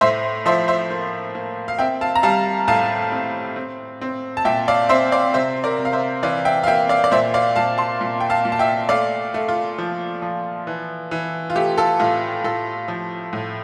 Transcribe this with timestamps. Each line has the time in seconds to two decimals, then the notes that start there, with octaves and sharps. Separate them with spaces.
0.01 A2 C5 E5
0.46 F3 C5 E5
0.68 C5 E5
0.90 A#3
1.35 A#3
1.68 F5
1.79 C4 E5 G5
2.01 F5 A5
2.15 A#5
2.23 G3 F5 A5
2.68 A2 F5 A5
3.12 C4
3.56 C4
4.01 C4
4.37 A5
4.45 A#2 E5 G5
4.68 D5 F5
4.89 C4 C5 E5
5.12 D5 F5
5.34 C3 C5 E5
5.64 A#4 D5
5.78 C3
5.85 F5
5.93 C5 E5
6.23 E3 D5 F5
6.45 E5 G5
6.64 F5
6.67 A#3 E5 G5
6.89 D5 F5
7.04 D5
7.12 A#2 C5 E5
7.34 D5 F5
7.56 A#2 F5 A5
7.78 A5 C6
8.01 A#2
8.20 G5
8.30 F5 A5
8.45 A#2
8.52 A5
8.59 E5 G5
8.89 A3 D5 F5
9.34 A3
9.49 F4
9.78 F3
10.22 F3
10.67 E3
11.11 E3
11.50 F4
11.56 A3 G4
11.78 F4 A4
12.00 A2 F4
12.44 A2 F4 A4
12.88 F3
13.33 A2